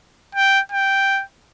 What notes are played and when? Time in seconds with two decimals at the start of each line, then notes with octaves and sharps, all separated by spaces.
0.35 G5
0.72 G5